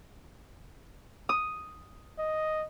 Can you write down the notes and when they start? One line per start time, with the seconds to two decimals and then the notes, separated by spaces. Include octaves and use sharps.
1.29 D#6
2.18 D#5